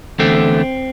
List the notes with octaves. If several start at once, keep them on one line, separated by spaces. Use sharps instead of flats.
E2 D3 A3 C4